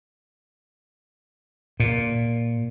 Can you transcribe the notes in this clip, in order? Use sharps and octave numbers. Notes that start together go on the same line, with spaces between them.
A#2